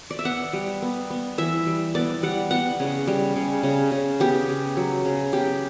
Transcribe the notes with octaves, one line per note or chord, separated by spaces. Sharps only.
D5
E5
B3 F#5
G3
B3
B3
E3 E5
G3
B3 D5
G3 F#5
B3 F#5
C#3
G3
C#3
C#3
C#3
B3 G4
C#3
F#3
C#3
B3 G4